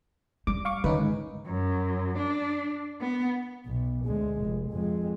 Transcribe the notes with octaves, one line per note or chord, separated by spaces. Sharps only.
G3 D6
F5 C#6 D6
D#3 C#4 D#4 B4
G#2
F#2
D4
B3
B1
D2 G#3
F1
F2 G#3